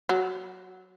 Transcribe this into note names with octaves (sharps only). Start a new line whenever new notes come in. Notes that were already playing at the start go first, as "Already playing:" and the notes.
F#3